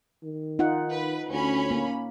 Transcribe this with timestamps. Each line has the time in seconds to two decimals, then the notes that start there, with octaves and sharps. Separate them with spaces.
0.23 D#3
0.59 D#4 F4 F#5
0.92 B4
1.30 D2 C#4 B5
1.71 A#3